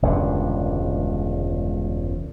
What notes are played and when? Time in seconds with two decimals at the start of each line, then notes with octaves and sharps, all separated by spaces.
0.02 E1 C#2 G2 D3